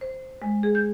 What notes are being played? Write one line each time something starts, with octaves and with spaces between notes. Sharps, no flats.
C5
G#3
G#4
G6